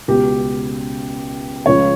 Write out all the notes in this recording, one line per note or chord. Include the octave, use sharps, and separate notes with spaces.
C#2 B2 G4
C#2 C#3 F3 C#5